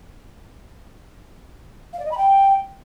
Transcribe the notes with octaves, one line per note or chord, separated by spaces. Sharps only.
F5
D5
D#5
B5
G5